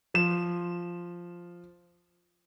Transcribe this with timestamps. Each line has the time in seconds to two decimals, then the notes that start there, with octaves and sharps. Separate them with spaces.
0.14 F3 E7